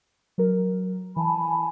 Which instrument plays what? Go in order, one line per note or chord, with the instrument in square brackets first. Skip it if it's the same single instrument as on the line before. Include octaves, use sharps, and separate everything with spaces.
[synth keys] F#3 A#4
[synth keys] E3 [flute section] G#5 A5 B5